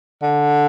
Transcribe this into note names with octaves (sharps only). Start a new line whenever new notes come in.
D3